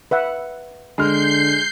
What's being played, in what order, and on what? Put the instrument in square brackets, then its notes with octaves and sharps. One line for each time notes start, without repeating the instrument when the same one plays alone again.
[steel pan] B4 E5 F#5
[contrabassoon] D3 [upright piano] G#3 F6 [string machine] G6 C7